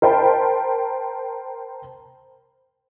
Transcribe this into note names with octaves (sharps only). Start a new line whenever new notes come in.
A#4 C5 G5 A5 B5